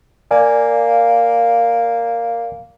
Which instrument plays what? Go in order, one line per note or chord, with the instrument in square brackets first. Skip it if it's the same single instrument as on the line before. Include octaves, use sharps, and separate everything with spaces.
[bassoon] A#3 [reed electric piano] D5 F5 G#5